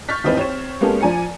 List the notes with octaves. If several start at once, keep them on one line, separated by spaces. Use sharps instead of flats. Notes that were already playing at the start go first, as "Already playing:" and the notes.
C#6 F6 G6 A6 B6
G#1 D#2 E3 C4 D#4 B4
C4 C#5 E7
G#3 A#3 B3 C#4 G4 A4
F3 D5 G#5 A#5 C#7